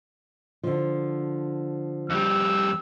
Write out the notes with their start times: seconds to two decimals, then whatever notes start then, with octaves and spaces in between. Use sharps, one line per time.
0.63 D3 F3
2.10 F2 G3 E6